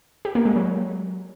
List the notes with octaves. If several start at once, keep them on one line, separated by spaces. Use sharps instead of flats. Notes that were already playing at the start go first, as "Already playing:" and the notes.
G4
A#3
G#3
F#3